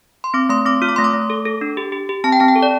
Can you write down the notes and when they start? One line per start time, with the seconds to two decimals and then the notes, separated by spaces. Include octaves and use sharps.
0.24 C6
0.34 C4 D6
0.49 A3 C6
0.66 C4 D6
0.82 F4 F6
0.89 D6
0.96 A3 C6
1.04 D6
1.13 A3
1.30 A4
1.45 A4
1.61 D4
1.77 G4
1.92 G4
2.09 G4
2.24 C4 A5
2.32 G5
2.40 C4 A5
2.48 G5
2.56 A4
2.63 D5